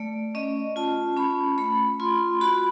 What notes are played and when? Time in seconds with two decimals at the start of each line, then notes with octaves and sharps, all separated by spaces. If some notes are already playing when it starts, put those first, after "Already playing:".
Already playing: A3 D5
0.35 C#4 D#5
0.76 F4 A5
1.17 C#4 B5
1.58 A3 B5
2.00 F4 C6
2.41 F#4 B5